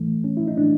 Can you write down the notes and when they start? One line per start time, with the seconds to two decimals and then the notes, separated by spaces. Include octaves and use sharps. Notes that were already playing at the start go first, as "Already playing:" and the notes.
Already playing: A2 E3 A3
0.24 C#4
0.37 E4
0.48 D#4
0.57 A2 E3 A3 D4